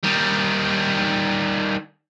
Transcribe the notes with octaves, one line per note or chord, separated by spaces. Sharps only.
D#3 G3